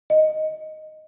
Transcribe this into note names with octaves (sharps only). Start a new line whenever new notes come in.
D#5